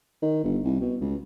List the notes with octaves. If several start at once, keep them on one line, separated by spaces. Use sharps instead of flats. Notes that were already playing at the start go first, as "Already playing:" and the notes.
D#3
G1
C2
B2
C#2